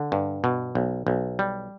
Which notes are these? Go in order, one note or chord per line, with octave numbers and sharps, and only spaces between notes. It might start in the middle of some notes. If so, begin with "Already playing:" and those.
Already playing: D3
G2
B2
B1
B1
G3